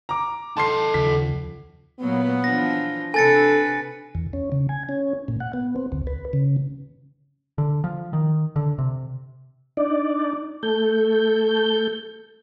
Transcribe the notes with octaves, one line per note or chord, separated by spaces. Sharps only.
A#5 D6
D#4 A4 A5 C6 C7
D#2 C#3 F3 B6
A#2 F#3 A#3 B3
E3 F3 D4 A#6
C3 D4 A4 B4 G#5 A6 C#7
E2
C#4
C#3
G#5
C#4
A#2
F#5
B3
C4
D2
B4
C#3
D3
F3
D#3
D3
C3
D4 D#4 D5
A3 A4 G6